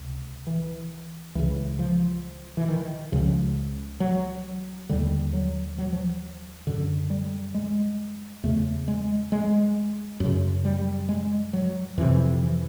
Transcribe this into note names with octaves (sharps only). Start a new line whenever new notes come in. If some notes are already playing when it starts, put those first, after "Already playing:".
Already playing: C#2 C3
E3
C#2 C#3 E3
F3
E3
D#3
C#2 C#3 F3
F#3
D#2 D3 G3
F#3
F#3
F3
F#2 D3
G3
G#3
E2 C#3 A3
G#3
G#3
F#2 C#3
G3
G#3
F#3
F2 C3 E3
E3